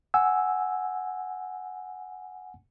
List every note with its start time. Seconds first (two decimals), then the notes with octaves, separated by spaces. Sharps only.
0.14 F#5 G#5 E6